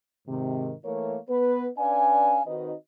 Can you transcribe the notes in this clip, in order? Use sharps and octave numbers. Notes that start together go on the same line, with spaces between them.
G#2 C3 D#3
E3 A3 A#3 A#4 C#5
B3 B4
C#4 D4 B4 D5 F5 G#5
D#3 C4 D#4 F#4 B4 D#5